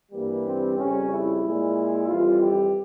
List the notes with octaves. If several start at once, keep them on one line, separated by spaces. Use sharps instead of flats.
G2 E3 G3 A#3
C4
F2 C#3 G3 C#4
E4
A#2 G#3
F2 E3 G3 F4
G4